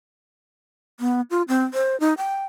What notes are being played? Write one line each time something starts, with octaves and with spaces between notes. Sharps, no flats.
B3
F4
C4
C5
D#4
G5